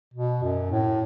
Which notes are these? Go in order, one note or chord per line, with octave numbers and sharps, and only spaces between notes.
B2
F#2
A2